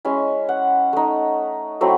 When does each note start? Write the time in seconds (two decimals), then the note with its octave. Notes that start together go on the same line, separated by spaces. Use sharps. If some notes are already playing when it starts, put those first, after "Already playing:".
0.05 G#3 C#4 E4 G#5
0.49 F#5
0.93 A3 D#4
1.81 F#3 A3 C4 E4